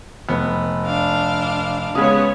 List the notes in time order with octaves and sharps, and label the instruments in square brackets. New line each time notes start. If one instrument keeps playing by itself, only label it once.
[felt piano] F1 [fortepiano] B3
[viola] D4 F5
[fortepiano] C#3 G#3 [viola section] B3 C#4 C#5 [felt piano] D#6